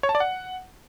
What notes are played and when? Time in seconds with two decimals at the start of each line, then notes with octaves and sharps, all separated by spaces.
0.03 C#5
0.09 A5
0.15 D5
0.20 F#5